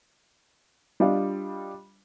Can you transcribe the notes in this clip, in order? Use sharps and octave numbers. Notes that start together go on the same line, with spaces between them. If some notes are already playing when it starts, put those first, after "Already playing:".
G3 D4 F4 D#5 F5